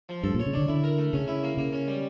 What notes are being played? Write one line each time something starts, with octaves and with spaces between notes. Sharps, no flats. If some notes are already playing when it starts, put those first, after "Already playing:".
F3
G2 A4
A#2 C#5
C#3
D3 D4
D3 E4
A#4
A3
C#3 C#4
E4
A#3
C#3 A#3
C#4
G3